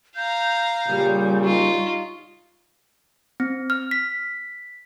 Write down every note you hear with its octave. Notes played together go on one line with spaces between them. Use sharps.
F5 A#5 G6
A#2 C#3 G3
D#4 F4 C#6
C4
F6
B6